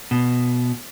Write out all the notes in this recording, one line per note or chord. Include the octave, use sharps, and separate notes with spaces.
B2